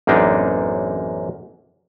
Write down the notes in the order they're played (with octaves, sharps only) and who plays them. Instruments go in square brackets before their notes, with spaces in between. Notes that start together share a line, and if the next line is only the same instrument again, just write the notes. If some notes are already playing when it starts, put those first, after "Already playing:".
[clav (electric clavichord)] A1 F#2 A#3 C4 D4 D#4